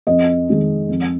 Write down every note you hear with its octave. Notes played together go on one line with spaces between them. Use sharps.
F2 D#5
D#3 G#3
F2